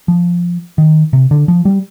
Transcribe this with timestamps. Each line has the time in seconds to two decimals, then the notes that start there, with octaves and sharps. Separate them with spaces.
0.08 F3
0.78 D#3
1.13 C3
1.31 D3
1.48 F3
1.65 G3